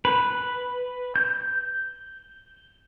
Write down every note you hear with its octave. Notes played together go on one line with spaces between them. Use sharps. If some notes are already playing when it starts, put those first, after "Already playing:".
B4
G6